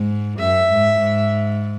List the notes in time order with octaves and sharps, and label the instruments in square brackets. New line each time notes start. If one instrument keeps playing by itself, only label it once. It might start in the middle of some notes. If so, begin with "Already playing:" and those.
Already playing: [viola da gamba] G#2
[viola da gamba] F#2 [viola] E5
[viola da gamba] G#2
G#2